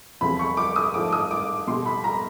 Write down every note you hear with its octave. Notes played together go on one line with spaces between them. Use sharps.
E2 C3 F3 B5
C#6
D6
D#6
G#2 F3 A3 D6
D#6
D6
B2 G3 C6
B5
A#5